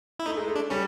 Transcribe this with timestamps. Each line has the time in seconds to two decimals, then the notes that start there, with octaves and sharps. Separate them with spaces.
0.19 E4
0.26 A3 D#4
0.37 G#3
0.48 A3
0.56 D4
0.70 G3 C#4